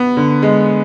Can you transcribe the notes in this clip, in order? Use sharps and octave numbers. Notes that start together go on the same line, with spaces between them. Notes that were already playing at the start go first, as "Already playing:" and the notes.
Already playing: B3
D3
G#3